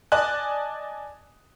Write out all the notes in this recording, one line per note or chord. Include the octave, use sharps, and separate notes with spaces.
D5 D#5 G#5 A5 F#6